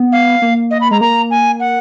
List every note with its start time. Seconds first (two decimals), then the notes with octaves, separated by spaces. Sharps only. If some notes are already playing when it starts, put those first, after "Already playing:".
Already playing: B3
0.12 F5
0.42 A#3
0.71 D#5
0.81 B5
0.91 G#3 A#5
1.01 A#3 A#5
1.31 G#5
1.60 F#5